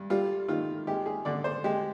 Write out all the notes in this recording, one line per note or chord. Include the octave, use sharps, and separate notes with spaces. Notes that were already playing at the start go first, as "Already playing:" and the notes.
Already playing: G2
G3 F4
D#3 F4
G#3 G4
G#4
D3 D5
C5
G#3 G4